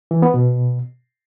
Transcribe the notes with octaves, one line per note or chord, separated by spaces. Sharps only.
E3
B3
B2